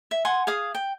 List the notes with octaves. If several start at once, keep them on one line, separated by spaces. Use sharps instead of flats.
E5
F#5 G#5 C6
G#4 F5 D#6
G5